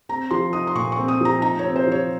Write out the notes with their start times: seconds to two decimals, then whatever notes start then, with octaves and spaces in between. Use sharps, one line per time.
0.09 C4 A#5
0.31 F3 C6
0.53 D#4 D#6
0.67 C6
0.75 A#2 C#6
0.92 C#6
0.97 C4
1.08 D#6
1.21 F3 A#5
1.42 D#4 A#5
1.59 C#5
1.64 C4
1.76 C5
1.87 F3 C#5